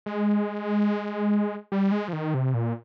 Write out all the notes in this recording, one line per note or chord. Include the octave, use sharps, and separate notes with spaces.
G#3
G3
G#3
F3
D#3
C3
A#2